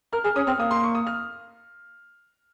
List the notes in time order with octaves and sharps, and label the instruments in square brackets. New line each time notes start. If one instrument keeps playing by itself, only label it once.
[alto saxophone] A#4 [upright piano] F6
[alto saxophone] G#4 [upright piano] F6
[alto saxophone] C#4 [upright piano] D#6
[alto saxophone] C4 [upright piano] F6
[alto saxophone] A#3 [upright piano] D#6
[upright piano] C6
C#6
D#6
F6